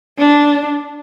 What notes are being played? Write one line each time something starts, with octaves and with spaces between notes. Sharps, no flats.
D4